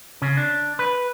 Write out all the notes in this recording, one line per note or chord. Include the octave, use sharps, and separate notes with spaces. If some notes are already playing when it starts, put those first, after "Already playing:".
C#3
D4
B4